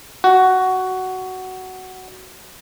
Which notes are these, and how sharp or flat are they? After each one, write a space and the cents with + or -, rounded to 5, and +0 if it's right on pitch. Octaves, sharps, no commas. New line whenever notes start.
F#4 +10